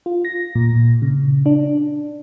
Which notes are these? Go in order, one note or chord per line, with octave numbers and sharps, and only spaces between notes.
F4
A#6
A#2
C#3
D4